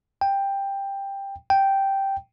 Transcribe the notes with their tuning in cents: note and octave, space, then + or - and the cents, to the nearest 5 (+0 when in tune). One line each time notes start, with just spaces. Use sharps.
G5 +10
G5 -5